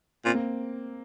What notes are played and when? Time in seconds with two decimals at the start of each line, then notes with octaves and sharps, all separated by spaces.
0.25 A#2 C4
0.34 A#3